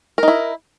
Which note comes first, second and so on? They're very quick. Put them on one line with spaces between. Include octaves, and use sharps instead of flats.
A#4 D#4 E4